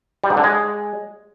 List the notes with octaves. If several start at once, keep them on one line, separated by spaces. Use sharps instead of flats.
G3
G#2
D3
G#3